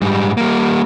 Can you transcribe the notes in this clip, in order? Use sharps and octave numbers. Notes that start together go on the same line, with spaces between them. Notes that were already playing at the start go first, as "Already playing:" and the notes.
G#2 G3
G3 A#3